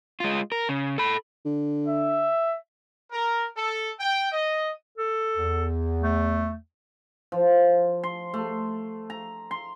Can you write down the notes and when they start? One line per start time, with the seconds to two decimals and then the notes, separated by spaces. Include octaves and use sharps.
0.20 G#3 F4
0.52 A#4
0.69 C#3
0.98 A4 B5
1.45 D3
1.87 E5
3.11 A#4
3.56 A4
4.00 G5
4.31 D#5
4.98 A4
5.37 E2
6.03 A3
7.32 F3
8.03 C6
8.34 A3
9.10 A#5
9.51 C6